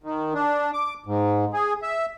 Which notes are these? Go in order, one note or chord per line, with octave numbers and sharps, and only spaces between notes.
D#3
D4
D6
G#2
G#4
E5